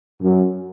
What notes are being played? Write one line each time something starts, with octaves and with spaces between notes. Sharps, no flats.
F#2